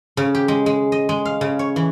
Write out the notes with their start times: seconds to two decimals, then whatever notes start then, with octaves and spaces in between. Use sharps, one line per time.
0.17 C#3
0.35 G4
0.48 G#3
0.66 G#3
0.92 D#5
1.09 G#3
1.25 F5
1.41 C#3
1.59 C#5
1.76 E3